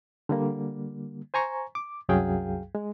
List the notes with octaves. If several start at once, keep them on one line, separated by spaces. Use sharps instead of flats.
D3 G3 A#3
C5 G#5 A#5 C#6
D6
C2 F#2 F#3 G#4 F5 G5
G#3